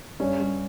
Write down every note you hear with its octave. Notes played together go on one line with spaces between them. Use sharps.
G2 C#4
G2